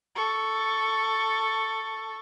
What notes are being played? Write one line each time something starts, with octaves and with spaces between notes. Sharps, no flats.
A4 C#6